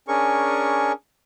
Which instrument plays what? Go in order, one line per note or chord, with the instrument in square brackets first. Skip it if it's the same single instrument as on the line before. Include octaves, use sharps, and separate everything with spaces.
[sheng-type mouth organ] C#4 D4 G#4 A#4 C#6